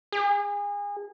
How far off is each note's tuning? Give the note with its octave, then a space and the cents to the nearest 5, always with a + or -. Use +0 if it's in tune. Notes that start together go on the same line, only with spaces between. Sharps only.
G#4 -30